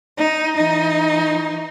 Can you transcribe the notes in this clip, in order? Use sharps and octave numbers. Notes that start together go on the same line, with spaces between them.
D#4
E3 D#4